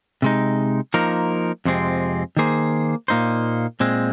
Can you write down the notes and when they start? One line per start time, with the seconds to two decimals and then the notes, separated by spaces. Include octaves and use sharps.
0.22 C3 G#3 D#4
0.94 F3 A#3 D#4 A#4
1.65 F2 C3 G#3 C4
2.37 D#3 A#3 G#4 C5
3.08 A#2 A#3 D#4 C5
3.80 A#2 G#3 C4